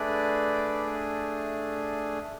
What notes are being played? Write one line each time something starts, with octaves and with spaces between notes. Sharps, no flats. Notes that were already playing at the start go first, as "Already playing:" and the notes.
Already playing: A3 D4 G#4 B4 D5